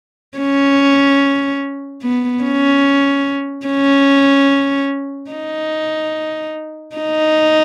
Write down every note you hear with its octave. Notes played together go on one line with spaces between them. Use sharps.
C#4
B3
C#4
C#4
D#4
D#4